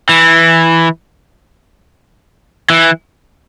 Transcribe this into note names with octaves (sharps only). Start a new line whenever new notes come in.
E3
E3